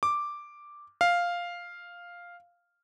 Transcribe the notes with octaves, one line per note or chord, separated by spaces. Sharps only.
D6
F5